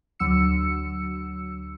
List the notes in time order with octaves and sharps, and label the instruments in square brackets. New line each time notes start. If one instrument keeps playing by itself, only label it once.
[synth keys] D2 F#3 E6 C#7